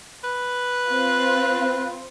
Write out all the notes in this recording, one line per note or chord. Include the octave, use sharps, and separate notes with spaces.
B4
C4 F4